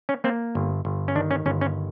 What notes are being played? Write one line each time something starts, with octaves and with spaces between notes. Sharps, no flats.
C#4
A#3 C4
G1
G1
C#4
D#3 D4
C#4
G1 C#4
C#4